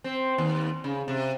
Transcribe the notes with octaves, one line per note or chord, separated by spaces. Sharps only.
C4
D#2
C#3
C3